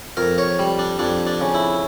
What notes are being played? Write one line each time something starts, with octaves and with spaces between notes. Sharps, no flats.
F2 A#4
C#5
G3
D4
F2 D4
D4
C#3
E4